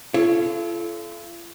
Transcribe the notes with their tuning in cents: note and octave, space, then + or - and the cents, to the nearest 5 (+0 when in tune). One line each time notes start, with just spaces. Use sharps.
F4 -45 A4 -25 C#5 +0